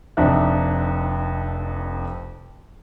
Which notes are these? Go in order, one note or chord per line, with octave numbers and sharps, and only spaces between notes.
F1 F2 D4 D#4 E5 F#6